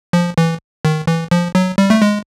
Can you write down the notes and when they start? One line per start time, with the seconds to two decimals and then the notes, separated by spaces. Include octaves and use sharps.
0.13 F3
0.38 E3
0.85 D#3
1.07 E3
1.31 F3
1.55 F#3
1.78 G3
1.90 A3
2.02 G#3